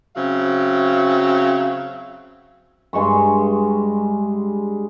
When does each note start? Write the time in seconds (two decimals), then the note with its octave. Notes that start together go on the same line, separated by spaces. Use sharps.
0.16 C#3 F#3 C4 E5 F5
2.93 G2 G#3 C6 C#6